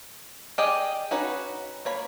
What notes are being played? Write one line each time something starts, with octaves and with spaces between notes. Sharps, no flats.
G4 G#4 D5 D#5 G5
C#4 D#4 F#4 B4
A#3 C#5 B5